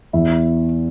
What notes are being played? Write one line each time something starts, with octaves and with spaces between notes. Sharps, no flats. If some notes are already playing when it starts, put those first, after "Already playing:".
E2 E4